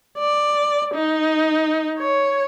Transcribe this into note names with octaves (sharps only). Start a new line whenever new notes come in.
D5
D#4
C#5